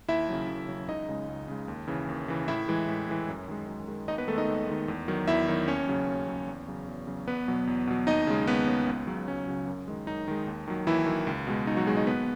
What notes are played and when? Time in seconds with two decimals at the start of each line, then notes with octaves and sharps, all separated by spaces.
0.08 D#2 E4 E5
0.29 C#3 F#3
0.48 D#2
0.68 C#3 F#3
0.89 C#2 D#4 D#5
1.08 C#3 G#3
1.28 C#2
1.48 C#3 G#3
1.68 D#2
1.88 C#3 E3
2.09 D#2
2.28 C#3 E3
2.48 A2 E4 E5
2.68 E3 G#3
2.88 A2
3.08 E3 G#3
3.28 F#2
3.48 D#3 G#3
3.68 F#2
3.88 D#3 G#3
4.08 D#2 D#4 D#5
4.18 B3 B4
4.28 D#3 G#3 A3 A4
4.38 D#4 D#5
4.48 D#2
4.68 D#3 G#3
4.88 E2
5.08 D#3 F#3
5.28 E2 E4 E5
5.48 D#3 F#3
5.67 D#2 C#4 C#5
5.88 C#3 F#3
6.08 D#2
6.28 C#3 F#3
6.48 E2
6.68 C#3 F#3
6.88 E2
7.07 C#3 F#3
7.28 E2 B3 B4
7.48 B2 F#3
7.67 E2
7.87 B2 F#3
8.07 D#2 D#4 D#5
8.27 C#3 G#3
8.47 D#2 B3 B4
8.67 C#3 G#3
8.87 C#2
9.07 C#3 F#3
9.28 C#2 C#4
9.47 C#3 F#3
9.67 F#2
9.88 D#3 G#3
10.07 F#2 D#4
10.28 D#3 G#3
10.47 D#2
10.68 D#3 F#3
10.86 D#2 E3 E4
11.06 D#3 F#3
11.27 C#2
11.47 B2 G#3
11.67 C#2 D#4
11.77 F#3 F#4
11.87 G#3 G#4
11.90 B2
11.97 D#4 D#5
12.07 D#2 B3 B4